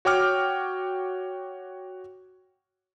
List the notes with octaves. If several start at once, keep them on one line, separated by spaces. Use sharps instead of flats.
F#4 C#5 G5 D6 F6